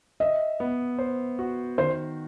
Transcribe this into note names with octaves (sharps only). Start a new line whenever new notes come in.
D#5 E5
B3
C5
F#4
D#3 C5